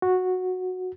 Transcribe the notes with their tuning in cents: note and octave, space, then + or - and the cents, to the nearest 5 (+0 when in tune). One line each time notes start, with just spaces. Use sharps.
F#4 -10